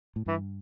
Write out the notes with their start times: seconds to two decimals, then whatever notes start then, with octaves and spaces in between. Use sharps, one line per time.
0.16 A2
0.26 G2 E3